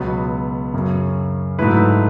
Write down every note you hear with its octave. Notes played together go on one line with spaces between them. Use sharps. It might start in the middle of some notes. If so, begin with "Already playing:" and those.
Already playing: C#2 B2 F#3 B3
F#2 C#3 F#3
G#2 F#3 A3 E4 B4